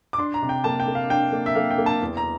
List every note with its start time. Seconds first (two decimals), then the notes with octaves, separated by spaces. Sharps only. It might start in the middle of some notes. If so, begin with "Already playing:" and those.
0.13 D6
0.18 D4 C6
0.34 A#5
0.42 C3
0.49 G5
0.64 A#3 A5
0.80 G5
0.88 A#3
0.95 F5
1.10 D4 G5
1.32 A#3
1.46 E5
1.55 A#3 F5
1.71 G5
1.78 A#3
1.86 A5
2.02 E2
2.17 A#5